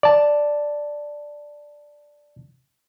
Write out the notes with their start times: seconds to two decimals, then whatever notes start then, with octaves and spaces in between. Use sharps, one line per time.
0.03 D5 A5